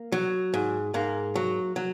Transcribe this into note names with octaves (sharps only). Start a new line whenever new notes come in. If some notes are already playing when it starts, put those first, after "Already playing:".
Already playing: A#3
F#3
G#2
G#2 A#3
F#3
F#3